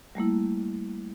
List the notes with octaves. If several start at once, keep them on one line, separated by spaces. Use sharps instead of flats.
G3 A3 A#3 E4